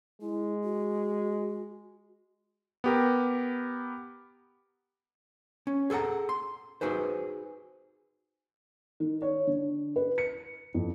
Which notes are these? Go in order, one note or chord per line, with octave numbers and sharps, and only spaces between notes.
G#3 E4
F#4
B3 G4 A#4
C#4
G#4 A4 B4 F#5 A#5
C6
D#4 F#4 G#4 B4 C5
D#3
C#5
D3
B4
C#7
F2